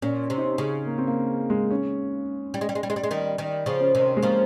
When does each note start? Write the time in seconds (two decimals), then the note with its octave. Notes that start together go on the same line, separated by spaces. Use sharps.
0.02 A#2 C#4
0.30 C3
0.38 D#4
0.44 C#4
0.58 C#3
0.86 A#3
0.98 C4
1.08 A#3
1.50 G#3
1.71 C#4
2.54 G3
2.61 G#3
2.69 G3
2.75 G#3
2.83 G3
2.90 G#3
2.96 G3
3.03 G#3
3.11 D#3 G3
3.38 D#3 G3
3.66 C#3 F3
3.81 C#4
3.95 C3 D#3
4.17 G#3
4.22 C#3 F3 A#3